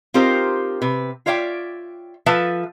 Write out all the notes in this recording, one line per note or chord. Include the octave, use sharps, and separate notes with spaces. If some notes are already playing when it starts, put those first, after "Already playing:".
C4 D#4 F4 G4 A#4 C5
C3 B4
F4 C#5 D5 E5 F#5 G5
F3 A4 B4 E5 A5